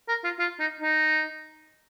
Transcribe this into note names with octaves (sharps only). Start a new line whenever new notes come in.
A#4
F4
F4
D#4
D#4